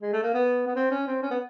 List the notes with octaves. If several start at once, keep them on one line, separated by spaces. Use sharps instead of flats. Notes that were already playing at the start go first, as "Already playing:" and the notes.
G#3
A3
A#3
B3
B3
C4
C#4
C4
C#4
B3